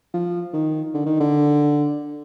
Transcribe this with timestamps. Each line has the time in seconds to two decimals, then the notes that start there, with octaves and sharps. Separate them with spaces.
0.14 F3
0.53 D#3
0.94 D3
1.06 D#3
1.20 D3